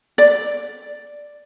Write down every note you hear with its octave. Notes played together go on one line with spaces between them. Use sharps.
D5